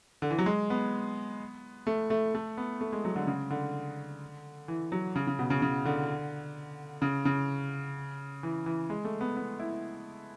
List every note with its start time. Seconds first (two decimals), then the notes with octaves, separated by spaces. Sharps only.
0.22 D3
0.31 E3
0.38 F#3
0.46 G#3
0.70 B3
1.87 A3
2.10 A3
2.35 A3
2.57 B3
2.81 A3
2.93 G#3
3.05 F#3
3.16 D3
3.27 C#3
3.50 D3
4.68 E3
4.92 F#3
5.16 C#3
5.27 C#3
5.39 B2
5.50 C#3
5.62 C#3
5.85 D3
7.02 C#3
7.25 C#3
8.43 E3
8.66 E3
8.90 G#3
9.05 A3
9.21 B3
9.37 B3
9.59 E4